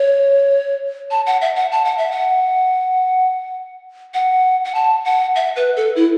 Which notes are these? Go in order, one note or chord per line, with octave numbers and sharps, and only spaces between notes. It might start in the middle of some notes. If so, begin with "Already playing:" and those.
Already playing: C#5
A5
F#5
E5
F#5
A5
F#5
E5
F#5
F#5
F#5
A5
F#5
E5
B4
A4
E4